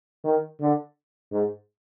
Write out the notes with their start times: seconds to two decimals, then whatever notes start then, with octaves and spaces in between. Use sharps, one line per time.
0.24 D#3
0.60 D3
1.32 G#2